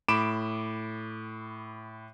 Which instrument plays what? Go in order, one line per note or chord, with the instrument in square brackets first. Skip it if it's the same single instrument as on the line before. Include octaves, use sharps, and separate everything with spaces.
[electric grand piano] A2 B5 D6 D7 E7